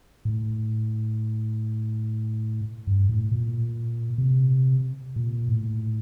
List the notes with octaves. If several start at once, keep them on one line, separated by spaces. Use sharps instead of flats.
A2
G2
A2
A#2
C3
A#2
A2